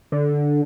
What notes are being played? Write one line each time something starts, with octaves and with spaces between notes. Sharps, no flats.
D3